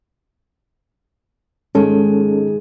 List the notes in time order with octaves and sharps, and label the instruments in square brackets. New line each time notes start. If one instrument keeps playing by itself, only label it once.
[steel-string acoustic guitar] G#2 D#3 G#3 [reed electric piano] C#4 A4